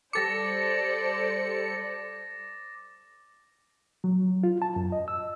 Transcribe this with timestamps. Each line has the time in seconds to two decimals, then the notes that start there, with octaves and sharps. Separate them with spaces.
0.13 G3 A4 C5 D5 D6 A6 A#6 C#7
4.04 F#3
4.43 F4
4.62 A5
4.76 F#2
4.92 D#5
5.08 E6